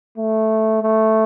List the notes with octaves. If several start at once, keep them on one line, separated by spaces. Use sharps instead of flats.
A3
A3